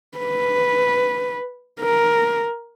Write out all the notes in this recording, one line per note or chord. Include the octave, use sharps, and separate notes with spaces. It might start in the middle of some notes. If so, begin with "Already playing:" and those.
B4
A#4